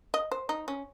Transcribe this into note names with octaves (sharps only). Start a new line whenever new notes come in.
D#5
C5
D#4
C#4